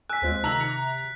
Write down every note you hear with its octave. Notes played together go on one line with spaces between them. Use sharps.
G#5 E6 F#6 B6
D#2 G#3 C4 F4
C3 D#3 A#5 E6 F#7
C3 C#7